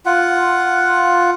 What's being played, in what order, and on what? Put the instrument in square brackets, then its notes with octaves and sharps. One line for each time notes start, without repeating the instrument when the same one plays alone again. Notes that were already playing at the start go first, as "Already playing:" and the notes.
[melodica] F4 F#5